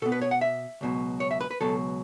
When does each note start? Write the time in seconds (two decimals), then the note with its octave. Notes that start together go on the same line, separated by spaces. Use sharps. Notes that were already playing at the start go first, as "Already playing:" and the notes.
0.02 B2 A4
0.06 B3
0.12 B4
0.22 C#5
0.31 F#5
0.41 E5
0.81 C#2 B2 F#3
1.20 C#5
1.31 E5
1.41 B4
1.51 B4
1.60 C#2 B2 F#3 A4